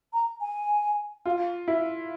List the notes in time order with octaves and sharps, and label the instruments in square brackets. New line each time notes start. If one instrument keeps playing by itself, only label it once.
[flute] A#5
G#5
[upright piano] F4
E4